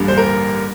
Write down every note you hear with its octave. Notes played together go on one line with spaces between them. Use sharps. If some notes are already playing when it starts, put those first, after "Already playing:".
Already playing: A1 G2 D3 G3 A#3
C5
A#4